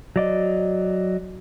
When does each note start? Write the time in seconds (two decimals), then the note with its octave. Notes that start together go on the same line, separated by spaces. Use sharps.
0.16 F#3 D5 D#5